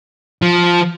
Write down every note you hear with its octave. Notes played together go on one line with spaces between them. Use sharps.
F3